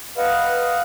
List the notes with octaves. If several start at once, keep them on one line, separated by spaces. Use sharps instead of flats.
B4 D#5 F5 F#5